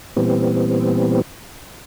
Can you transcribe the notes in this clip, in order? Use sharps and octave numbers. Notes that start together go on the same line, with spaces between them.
A#2 E3 G3 B3 C4